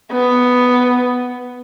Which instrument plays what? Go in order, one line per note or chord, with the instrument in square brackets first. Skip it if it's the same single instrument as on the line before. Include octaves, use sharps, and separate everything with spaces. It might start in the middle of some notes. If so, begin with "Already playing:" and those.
[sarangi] B3